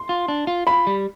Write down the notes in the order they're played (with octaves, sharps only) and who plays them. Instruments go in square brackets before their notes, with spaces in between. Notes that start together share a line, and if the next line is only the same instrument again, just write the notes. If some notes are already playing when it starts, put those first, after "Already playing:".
Already playing: [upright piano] C6
[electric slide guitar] F4
D4
F4
[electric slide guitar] F4 [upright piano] B5
[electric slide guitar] G3